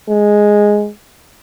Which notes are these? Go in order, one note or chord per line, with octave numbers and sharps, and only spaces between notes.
G#3